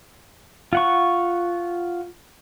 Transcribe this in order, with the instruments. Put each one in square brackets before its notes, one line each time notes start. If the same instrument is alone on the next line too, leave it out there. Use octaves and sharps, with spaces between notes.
[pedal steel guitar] F4 F#5 C#6